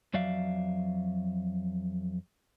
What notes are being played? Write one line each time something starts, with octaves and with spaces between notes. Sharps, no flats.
F2 F#3 D5 E5 F5